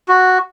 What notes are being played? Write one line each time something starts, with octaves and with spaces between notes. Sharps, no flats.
F#4